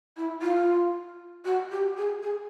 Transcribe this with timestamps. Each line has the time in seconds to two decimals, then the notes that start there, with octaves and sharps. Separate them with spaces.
0.17 E4
0.42 F4
1.45 F#4
1.71 G4
1.97 G#4
2.23 G#4